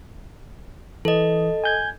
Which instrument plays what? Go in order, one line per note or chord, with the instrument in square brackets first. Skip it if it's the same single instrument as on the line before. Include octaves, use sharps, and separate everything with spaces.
[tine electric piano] E3 [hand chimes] A4 D#5
[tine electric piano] G#5 G6 G#6